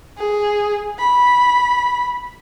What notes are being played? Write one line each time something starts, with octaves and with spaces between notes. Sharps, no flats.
G#4
B5